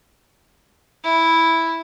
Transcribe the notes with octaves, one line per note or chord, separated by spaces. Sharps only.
E4